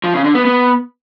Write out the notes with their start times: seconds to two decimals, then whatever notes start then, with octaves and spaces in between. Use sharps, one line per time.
0.04 F3
0.14 C#3
0.24 D3
0.35 B3
0.45 B3